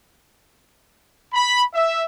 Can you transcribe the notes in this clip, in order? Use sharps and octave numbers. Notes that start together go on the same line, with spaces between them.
B5
E5